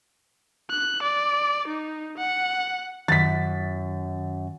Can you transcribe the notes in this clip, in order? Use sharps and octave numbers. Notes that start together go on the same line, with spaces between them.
F#6
D5
D#4
F#5
F#2 D#3 A6 B6